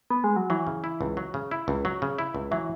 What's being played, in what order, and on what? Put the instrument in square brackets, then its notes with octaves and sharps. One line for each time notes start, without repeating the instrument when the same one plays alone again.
[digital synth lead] B3
G#3
F#3
[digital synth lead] E3 [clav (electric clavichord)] F#3
[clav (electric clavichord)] C#3
E4
C#2
F#3
C#3
E4
C#2
F#3
C#3
E4
C#2
[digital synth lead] E3 [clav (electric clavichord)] F#3